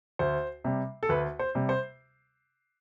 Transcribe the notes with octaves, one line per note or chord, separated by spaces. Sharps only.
D2 C5
C3 G3
A4
D2 B4
C5
C3 G3
C5